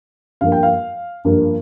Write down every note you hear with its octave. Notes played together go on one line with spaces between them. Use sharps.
G2 F3 A#3 F5
G5
F5
G2 F3 A#3